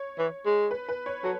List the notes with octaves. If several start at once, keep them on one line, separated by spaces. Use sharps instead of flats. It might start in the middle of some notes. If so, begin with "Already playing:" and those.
Already playing: C#5
E3
G#3
B4
B4
C#5
F#3 A4